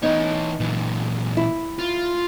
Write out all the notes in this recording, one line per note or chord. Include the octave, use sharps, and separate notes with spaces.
E3 B3 D#4 C#5
A#2 E3
E4
F4